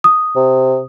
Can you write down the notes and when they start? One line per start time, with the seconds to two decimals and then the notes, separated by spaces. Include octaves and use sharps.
0.04 D#6
0.36 C3